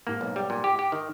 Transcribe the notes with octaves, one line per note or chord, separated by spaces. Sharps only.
G#2 A#3
B1
G3
A#2
G4
G4
D#3